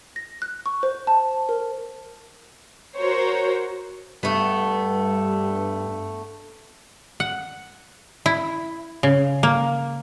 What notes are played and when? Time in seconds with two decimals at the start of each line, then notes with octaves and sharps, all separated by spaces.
0.16 A#6
0.42 F#6
0.66 C#6
0.83 C5
1.07 A5
1.49 A#4
2.97 F#4 A#4 C5 C#5
4.23 G2 A3 B3
7.20 F#5
8.26 E4
9.03 C#3
9.43 A#3